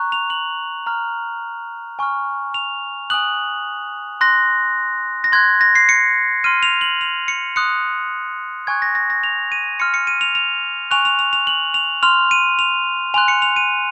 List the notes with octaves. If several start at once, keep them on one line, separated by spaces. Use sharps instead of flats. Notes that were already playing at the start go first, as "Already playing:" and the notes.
Already playing: A#5 C#6 F#6
F7
F#7
A#5 F6
G#5 C#6 F6
F7
G#5 D#6 F#6 F#7
C6 F#6 A#6
A#6
C6 F#6 G#6
A#6
C7
C#7
C6 F6 D#7
F7
F#7
F7
C#7
C6 D#6 F#6 C#7
G#5 C#6 F#6 G#6
A#6
A#6
A#6
F7
D#7
C6 F6 C#7
C#7
D#7
F7
F7
G#5 C#6 F#6 F7
F7
F7
F7
F#7
F7
C6 F6 F7
D#7
F7
G#5 C6 F#6 F7
C#7
F7
D#7